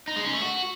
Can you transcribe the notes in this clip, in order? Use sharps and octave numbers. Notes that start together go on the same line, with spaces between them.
D#4
G#3
C#4
A3
F#4